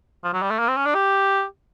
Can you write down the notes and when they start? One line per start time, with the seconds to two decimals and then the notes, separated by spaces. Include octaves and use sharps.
0.24 F3
0.34 F#3
0.42 G3
0.50 A3
0.59 A#3
0.69 C4
0.77 C#4
0.86 D4
0.95 G4